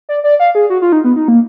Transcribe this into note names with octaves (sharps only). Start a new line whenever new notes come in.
D5
D5
F5
G#4
F#4
F4
D#4
B3
D#4
A#3